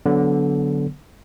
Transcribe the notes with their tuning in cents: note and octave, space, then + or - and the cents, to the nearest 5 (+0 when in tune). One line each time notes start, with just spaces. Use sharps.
D3 -15 F#3 +0 B3 +0